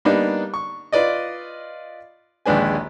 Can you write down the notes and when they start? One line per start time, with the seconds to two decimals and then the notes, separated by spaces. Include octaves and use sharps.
0.05 G3 A#3 B3 D4 D#4
0.54 C#6
0.92 F4 B4 D5 D#5
2.46 A#1 D#2 G#3 D4 B4 G#5